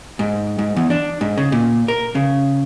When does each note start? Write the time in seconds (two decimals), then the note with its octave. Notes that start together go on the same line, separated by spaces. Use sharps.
0.19 G#2
0.59 G#2
0.76 E2
0.90 D4
1.21 G#2
1.38 C#3
1.52 A#2
1.88 A#4
2.15 C#3